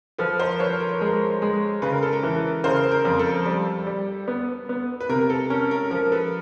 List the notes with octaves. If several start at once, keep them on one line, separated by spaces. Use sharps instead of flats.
F3 A4 B4
A#4 C5
F3 B4 C#5
A#4
B4
G#3
A#4
G#3
C#3 B4
A#4
A4
A#4
E3
C#3 A#4 C5
A#4
F2
A4
G3 A4
G3
B3
B3
B4
C3 A#4
A#4
A4
C#4 A#4
A#4
F3 A#4
A4 B4